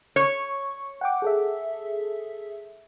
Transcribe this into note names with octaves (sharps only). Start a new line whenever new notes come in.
C#5 C#6
F#5 G5 D6
G#4 A4 E5